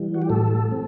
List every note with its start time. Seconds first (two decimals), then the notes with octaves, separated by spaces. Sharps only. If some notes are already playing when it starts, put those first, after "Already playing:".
Already playing: E3 G3
0.14 F#4
0.22 G4
0.30 A2 A4
0.71 C4